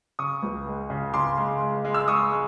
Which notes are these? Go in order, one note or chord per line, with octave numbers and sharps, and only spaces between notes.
C#3 C#6 D#6
C#2
G#3
C#3
C#3 C6 D6
G#3
G#3
G#3
E6
G#3 C#6 D#6
G#3